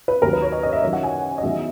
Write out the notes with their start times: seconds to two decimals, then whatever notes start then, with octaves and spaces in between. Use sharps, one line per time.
0.08 B4
0.22 D#2 D#3 F#3 A#4
0.33 B4
0.42 C#5
0.52 D#5
0.63 D#5
0.73 E5
0.82 F#2 D#3 F#3 C#5
0.93 F#5
1.03 G#5
1.38 D#5
1.43 E2 D#3 F#3 E5